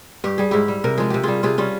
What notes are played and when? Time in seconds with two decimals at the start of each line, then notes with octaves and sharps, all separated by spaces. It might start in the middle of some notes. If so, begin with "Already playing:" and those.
0.24 G2 G4
0.38 G3 G#4
0.51 G#2 E4 G4
0.68 G3
0.84 C3 A#4
0.97 F3 G#3 G#4
1.10 C3 G4
1.23 G3 F4 G#4
1.43 C3 F4 G#4
1.58 G3 C#4 F4